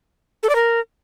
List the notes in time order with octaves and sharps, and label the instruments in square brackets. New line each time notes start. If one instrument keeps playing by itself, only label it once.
[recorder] A4
D5
A#4